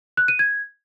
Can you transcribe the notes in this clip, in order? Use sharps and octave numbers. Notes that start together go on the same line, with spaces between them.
F#6
D#7
G#6